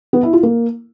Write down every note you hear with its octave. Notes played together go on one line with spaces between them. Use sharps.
B3
E4
F4
A#3